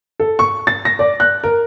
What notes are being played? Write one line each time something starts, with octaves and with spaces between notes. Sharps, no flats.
A4
C#6
A6
A#6
D5
F#6
A#4